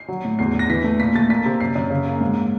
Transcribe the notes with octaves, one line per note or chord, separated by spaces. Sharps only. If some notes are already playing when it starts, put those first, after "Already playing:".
Already playing: C7
F#3
A2
E2 C7
E2
A#6
E3 B6
A3
A#2 B6
A3 A6
A#3 B6
C3
F#2 C7
F#2
C#3
A#3
G#2